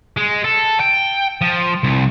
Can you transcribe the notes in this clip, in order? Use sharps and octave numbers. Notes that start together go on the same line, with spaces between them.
G#3
A4
G5
F3
C2